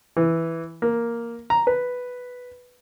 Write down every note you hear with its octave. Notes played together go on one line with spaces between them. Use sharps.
E3
A#3
A#5
B4